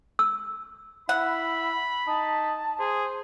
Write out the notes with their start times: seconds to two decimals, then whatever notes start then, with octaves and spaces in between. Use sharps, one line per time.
0.19 E6
1.09 E4 F#5 B5
2.07 D#4 A5
2.79 G#4 C5